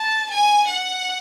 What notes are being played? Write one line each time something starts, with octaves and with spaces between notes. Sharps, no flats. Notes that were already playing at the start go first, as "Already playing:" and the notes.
Already playing: A5
G#5
F#5